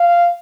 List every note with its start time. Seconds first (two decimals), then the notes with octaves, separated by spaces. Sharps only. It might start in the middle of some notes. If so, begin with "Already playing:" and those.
Already playing: F5